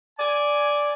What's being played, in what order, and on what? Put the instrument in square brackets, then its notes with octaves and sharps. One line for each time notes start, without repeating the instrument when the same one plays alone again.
[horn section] D5 G#5